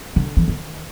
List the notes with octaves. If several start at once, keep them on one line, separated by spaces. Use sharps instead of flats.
D3
E3
D#3